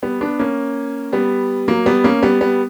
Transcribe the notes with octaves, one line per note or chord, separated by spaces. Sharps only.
G3 B3
B3 D4
A#3 C#4
G3 B3
F#3 A#3
G3 B3
A#3 C#4
G3 B3
G3 B3